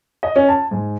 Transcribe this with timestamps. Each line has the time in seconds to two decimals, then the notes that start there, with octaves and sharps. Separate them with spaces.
0.23 D#5
0.36 C#4
0.49 A5
0.71 G#2